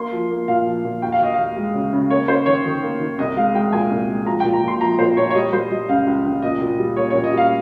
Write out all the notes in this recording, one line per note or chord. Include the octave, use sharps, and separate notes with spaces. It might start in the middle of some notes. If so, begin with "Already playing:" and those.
Already playing: A#3 C6
F3
A#3
A#2 F5
F3
A#2
D#2 G5
F5
D#2 D#5
D#2 F5
G#3
C#3
C#3
A#3 C#5
C#4 C5
D#3 C#5
D#3
A#3
D#3
C2 D#5
G#3 F5
G#3 G5
A#2 G#5
C2
G#3
F3 A#5
A#2 G5
A#5
A#2
C6
F3 A#5
A#2 C5
A#2 C#5
C#5
G3 D#5
G3 C5
G3 D#5
C#2 F5
C#2
C#2
A#2 D#5
A#2
G3
A#3 C#5
C#5
A#2
D#5
G3
F5